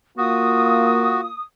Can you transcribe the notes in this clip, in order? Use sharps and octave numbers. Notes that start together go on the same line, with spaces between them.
A#3 F4 F#4 D#6